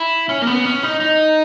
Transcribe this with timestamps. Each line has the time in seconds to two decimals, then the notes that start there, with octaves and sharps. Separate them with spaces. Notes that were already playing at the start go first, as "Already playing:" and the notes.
Already playing: E4
0.29 C#4
0.42 A#3
0.47 B3
0.65 C#4
0.83 D#4
1.00 D#4